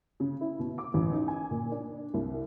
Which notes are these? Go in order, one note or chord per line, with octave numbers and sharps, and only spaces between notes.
C#3
E4
B2
D6
A1
D#4
G#5
A#2
D4
C2